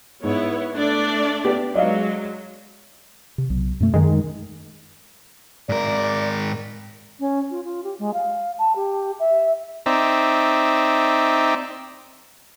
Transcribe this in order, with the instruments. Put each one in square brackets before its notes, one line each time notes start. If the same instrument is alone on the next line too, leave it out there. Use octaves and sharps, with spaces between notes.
[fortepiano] G#2 [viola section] B3 E4 C#5
[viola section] A3 D4 D5
[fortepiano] B3 G4
[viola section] F#3 G#3 [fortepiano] D5 D#5 F5
[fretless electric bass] C3
B1
F#2 B2 A3
[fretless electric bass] F#2 [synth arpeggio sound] D#3 G#3
[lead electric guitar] G#2 A#4 [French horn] D5
[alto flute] C#4
F4
F4
G4
G#3
F5
A5
G4
E5
[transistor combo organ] C4 D#4 D5 E5